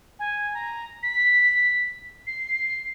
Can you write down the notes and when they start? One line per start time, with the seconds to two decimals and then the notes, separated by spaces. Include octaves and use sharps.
0.19 G#5
0.54 A#5
1.03 B6
2.27 C7